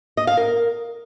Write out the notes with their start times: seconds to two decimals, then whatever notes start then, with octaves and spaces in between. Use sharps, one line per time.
0.17 D#5
0.27 F5
0.37 A#4